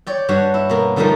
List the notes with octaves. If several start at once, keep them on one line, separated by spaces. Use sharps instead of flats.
C#5 D5 G5
G2 G3 F#4 C#5
E4
B2 A#3
D3 F3 G3 A3 A#3 D#4